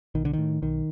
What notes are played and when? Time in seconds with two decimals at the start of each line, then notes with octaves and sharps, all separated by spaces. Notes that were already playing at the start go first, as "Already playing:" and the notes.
0.15 B1 D#3
0.25 D3
0.33 A2 D#3
0.62 B1 D#3